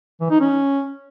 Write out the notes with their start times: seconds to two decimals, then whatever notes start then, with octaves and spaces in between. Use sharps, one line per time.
0.21 E3
0.30 D#4
0.40 C#4